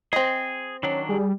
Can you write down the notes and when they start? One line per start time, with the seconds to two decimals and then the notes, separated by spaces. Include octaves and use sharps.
0.13 C4 G#4 D#5
0.83 D#3 F#3 C#4 D4
1.09 G3 G#4